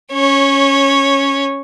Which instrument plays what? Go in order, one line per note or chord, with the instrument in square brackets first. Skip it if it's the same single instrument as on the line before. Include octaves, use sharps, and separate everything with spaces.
[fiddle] C#4 C#5